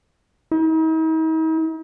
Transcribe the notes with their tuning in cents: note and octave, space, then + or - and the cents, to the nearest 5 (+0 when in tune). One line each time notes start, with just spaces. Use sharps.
D#4 +45